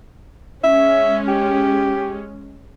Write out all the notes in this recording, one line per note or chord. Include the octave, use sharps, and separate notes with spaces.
G#3 C#4 E5
G4